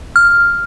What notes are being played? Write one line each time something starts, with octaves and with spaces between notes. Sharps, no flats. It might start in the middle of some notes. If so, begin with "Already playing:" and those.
F6